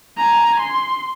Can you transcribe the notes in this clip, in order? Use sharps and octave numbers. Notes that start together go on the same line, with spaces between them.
G#5 A#5
C6